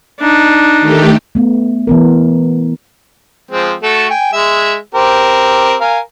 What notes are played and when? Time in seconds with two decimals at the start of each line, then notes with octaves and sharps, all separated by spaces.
0.20 D4 D#4
0.81 D#3 A3 G4
1.35 A3 B3
1.87 E3 B3 A#4
3.51 F3 G#3 C4
3.83 A3 F#4 A4
4.10 G5 G#5
4.33 G#3 E5
4.94 C4 G4 A#4
5.81 A#4 F5 G#5